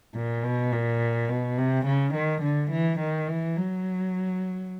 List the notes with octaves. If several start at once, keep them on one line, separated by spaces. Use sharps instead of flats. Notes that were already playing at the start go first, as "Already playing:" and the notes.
A#2
B2
A#2
B2
C3
C#3
D#3
D3
E3
D#3
E3
F#3